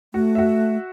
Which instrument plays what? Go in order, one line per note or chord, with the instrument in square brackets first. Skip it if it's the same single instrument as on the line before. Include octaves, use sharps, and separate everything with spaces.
[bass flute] A3 [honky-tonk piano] F#4
[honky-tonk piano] F#4 E5